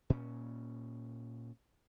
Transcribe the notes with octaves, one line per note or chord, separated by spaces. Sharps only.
A#2 C#4